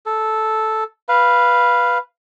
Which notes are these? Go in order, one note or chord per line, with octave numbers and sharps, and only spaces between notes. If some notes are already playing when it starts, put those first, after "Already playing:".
A4
B4 F5